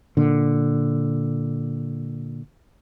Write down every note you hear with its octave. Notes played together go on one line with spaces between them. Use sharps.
A#2 D3